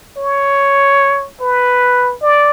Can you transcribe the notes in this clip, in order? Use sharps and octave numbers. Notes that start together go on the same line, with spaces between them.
C#5
B4
D5